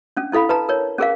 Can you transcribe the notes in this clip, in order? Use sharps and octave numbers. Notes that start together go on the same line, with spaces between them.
C#4 D4
C#4 E4 A4 F5 B5
B4 A5 A#5
A#4 C#5
C#4 G#4 A#4 F5